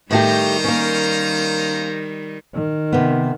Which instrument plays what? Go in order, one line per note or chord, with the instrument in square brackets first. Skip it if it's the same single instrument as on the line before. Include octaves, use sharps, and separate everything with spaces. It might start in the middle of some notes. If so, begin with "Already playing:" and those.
[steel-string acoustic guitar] A2 A3 G4 [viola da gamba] D#3 G3 [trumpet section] C5 A#5
[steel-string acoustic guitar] A#3 C#4
[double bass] D#3
[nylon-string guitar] C3 B3